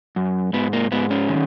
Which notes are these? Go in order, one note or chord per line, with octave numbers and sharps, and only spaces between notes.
F#2
G#2 B3
A#3
G#2 B3
C#4
D#3